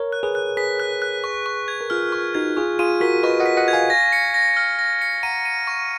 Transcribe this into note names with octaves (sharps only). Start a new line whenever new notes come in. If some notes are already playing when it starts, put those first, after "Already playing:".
Already playing: A#4 C#5
F#6
G#4 B4
F#6
G#4 B4 B6
F#6
F#6
C#6
C#6
G#6
A#4
F4 G#4 F6
C#6
D#4 F#4 G#6
F4 G#4 C#6
F4 G#4 D#7
F#4 A#4 B6
B4 D#5 C#6
D#5 F#5
B6
D#5 F#5
G#6
F5 G#5
A#6
C#7
A#6
F6
A#6
C#7
F#5 A#5 D#7
D#7
C#6